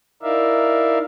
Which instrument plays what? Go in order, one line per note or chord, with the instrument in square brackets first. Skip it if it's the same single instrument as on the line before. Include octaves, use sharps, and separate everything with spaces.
[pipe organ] D#4 E4 A#4 D5 E5 F5